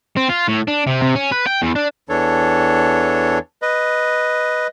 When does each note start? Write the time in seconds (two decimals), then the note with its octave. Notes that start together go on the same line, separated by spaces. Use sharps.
0.16 C4
0.29 F4
0.48 A2
0.68 D4
0.87 C3
1.02 C3
1.15 C#4
1.32 B4
1.47 G5
1.62 E2
1.75 D4
2.09 E2 E3 D4 A4 C#5
3.62 B4 D#5